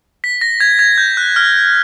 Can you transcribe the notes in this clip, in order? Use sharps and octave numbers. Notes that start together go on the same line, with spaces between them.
B6
A#6
G#6
G#6
G6
F#6
F6